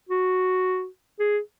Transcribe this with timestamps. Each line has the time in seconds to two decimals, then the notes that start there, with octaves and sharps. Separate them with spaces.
0.09 F#4
1.19 G#4